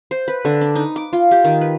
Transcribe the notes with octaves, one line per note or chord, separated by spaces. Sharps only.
C5
B4
D3
D4
D#4
D6
F4
G4
D#3
B4